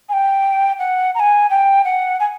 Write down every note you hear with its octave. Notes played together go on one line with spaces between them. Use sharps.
G#5
G5
F#5
A#5
G#5
G5
F#5
G#5